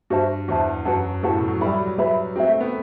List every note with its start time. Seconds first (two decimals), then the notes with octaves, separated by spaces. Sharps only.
0.10 G2 F#4 C5 E5 A5
0.48 E2 F#4 C5 E5 A5
0.85 F#2 F#4 B4 F#5 A5
1.23 A2 F#4 B4 F#5 A5
1.35 B2
1.48 F#3
1.60 G3 B4 E5 B5
1.73 F#3
1.86 F#3
1.98 F#3 B4 E5 B5
2.36 C4 F#4 B4 E5
2.48 A3
2.60 B3